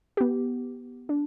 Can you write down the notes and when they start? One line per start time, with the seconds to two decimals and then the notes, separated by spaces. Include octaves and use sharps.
0.17 B3 G4
1.09 D4